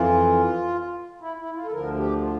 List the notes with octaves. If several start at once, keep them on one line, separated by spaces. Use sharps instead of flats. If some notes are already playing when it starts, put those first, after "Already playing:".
Already playing: F2 E3 F4
E4
E4
F4
A4
D2 D3 F3 A#4
G4
F4